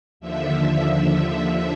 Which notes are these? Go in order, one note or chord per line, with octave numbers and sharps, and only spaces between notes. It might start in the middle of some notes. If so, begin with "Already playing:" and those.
D#2 D3 F3 E5